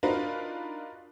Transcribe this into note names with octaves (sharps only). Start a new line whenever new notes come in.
D4 D#4 F4 F#4 A#4 B4